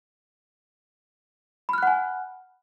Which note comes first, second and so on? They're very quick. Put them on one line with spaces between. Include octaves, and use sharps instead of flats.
B5 F6 F#6 F#5 G#5